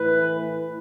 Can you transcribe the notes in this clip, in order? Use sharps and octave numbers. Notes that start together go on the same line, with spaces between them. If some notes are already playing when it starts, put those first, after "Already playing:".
Already playing: A2 E3 B4